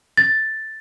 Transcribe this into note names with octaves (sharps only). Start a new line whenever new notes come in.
A6